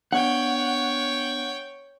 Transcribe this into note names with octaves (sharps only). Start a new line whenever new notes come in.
B3 D4 C#5 F#5 G5